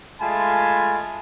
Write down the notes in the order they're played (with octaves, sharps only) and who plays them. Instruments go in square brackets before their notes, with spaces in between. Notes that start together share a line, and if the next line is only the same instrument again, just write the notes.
[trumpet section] G#3 A3 F4 G#5 A5 B5